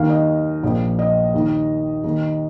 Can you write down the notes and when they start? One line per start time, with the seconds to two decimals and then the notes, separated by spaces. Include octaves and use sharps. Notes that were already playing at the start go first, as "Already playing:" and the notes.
Already playing: D#2 D#3 F5
0.09 D#5
0.63 A#1 A#2 F3
0.99 D#5
1.34 D#2 D#3
2.04 D#2 D#3